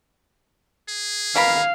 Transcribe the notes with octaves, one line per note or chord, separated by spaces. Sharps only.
G#4
B2 A#4 F5 B5